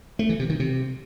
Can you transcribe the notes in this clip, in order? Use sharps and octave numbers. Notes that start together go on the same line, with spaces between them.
A3
E3
C3
D#3
C3